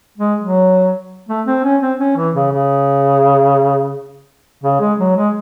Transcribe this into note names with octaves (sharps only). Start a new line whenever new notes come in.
G#3
F#3
A3
C4
C#4
C4
C#4
E3
C#3
C#3
C#3
G#3
F#3
G#3